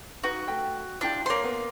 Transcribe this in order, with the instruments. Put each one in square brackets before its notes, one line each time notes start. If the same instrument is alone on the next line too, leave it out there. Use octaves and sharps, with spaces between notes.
[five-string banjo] D#4 B4 [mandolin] F#4
[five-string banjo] A3 G5
[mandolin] D4 [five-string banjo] E4 F4 G4
[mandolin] A#3 C6 [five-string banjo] C5 C#5
[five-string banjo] B3